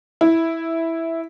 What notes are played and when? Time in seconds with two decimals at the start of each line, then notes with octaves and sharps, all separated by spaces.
0.21 E4